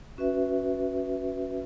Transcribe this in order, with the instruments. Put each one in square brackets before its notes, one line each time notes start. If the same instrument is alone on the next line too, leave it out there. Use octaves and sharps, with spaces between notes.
[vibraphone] C#4 F#4 B4 E5